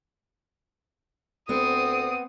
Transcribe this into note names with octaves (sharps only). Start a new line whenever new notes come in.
D2 B3 C4 D#6